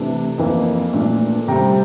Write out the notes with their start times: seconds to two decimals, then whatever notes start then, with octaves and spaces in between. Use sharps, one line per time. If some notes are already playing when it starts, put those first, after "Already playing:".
Already playing: C3 E3 A3 D4
0.38 F2 E3 A#3
0.93 A#2 A3 D4
1.48 C3 G3 C4 G5 A#5